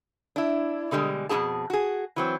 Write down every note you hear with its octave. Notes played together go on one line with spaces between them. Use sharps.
D4 E4
B2 D3 G3 G#3
F2 B2 E3 C4 G#4 A5
F#4 G#4
E3 F#3 C4